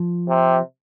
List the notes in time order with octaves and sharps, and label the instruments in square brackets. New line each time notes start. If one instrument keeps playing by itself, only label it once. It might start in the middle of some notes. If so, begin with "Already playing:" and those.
Already playing: [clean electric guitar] F3
[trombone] C3